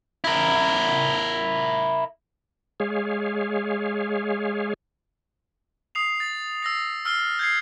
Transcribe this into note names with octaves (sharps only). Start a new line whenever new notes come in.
E4 A#4
G#3 G#4 C#5 F5
D#6 C7 F7
A6
E6 A#6 C7
E6 F6 C7 G7
G6 G#6 C7